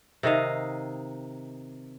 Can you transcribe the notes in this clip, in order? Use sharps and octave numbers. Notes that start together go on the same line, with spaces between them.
C3 D#3 D#5 F5